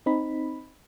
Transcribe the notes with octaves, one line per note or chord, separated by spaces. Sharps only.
C4 D#4 B5